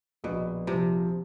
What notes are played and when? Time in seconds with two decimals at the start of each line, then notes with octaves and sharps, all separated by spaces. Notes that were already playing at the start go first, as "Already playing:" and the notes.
0.24 A#1 B2
0.67 C3 F3